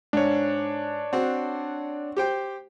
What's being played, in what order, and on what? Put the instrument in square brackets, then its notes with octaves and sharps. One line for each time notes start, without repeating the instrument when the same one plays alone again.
[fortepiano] G#2 [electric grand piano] D4 C#5
[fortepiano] C4 F#4
G4 C5 G5